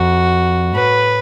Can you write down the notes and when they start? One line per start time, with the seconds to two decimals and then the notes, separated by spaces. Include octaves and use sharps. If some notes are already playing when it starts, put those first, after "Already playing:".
Already playing: F2 F#4
0.75 A2 B4